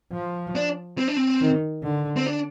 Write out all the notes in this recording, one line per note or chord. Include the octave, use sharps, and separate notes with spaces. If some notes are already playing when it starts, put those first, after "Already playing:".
F3
D4
C4
D4
C4
D#3
D3
C4
D4